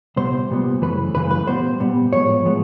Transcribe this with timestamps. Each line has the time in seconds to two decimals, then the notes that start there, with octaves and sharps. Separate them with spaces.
0.16 C2 A#2 G3 B3 C5
0.49 C2 A#2 G3 B3
0.81 F#2 C#3 E3 A3 B4
1.14 F#2 C#3 E3 A3 B4
1.31 B4
1.47 A#2 G3 B3 C5
1.80 A#2 G3 B3
2.13 A2 F3 G#3 B3 C#5
2.45 A2 F3 G#3 B3